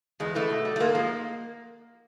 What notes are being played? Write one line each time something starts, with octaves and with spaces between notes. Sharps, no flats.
E2 G#3
C#3 E3 G#3 A3
B2
G3
A3
G#2 A#3
F3 G#3